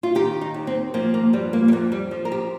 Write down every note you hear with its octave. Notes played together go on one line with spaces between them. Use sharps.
F4
D#3 G4
D#4
D#2
C4
F3 A#3
A#3
G2 G3
A#3
G3
F2 A#3
G3
F3
A#4
G4